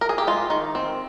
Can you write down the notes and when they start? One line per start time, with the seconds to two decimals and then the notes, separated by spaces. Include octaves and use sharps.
0.01 A#4
0.09 G#4
0.18 G4
0.27 G#3 F4
0.50 D#3
0.75 C4